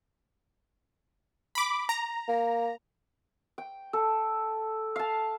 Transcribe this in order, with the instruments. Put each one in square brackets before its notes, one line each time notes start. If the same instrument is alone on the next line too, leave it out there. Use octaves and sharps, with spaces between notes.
[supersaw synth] B5 D6
A#5
[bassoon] A#3
[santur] G5
A4
F5 A5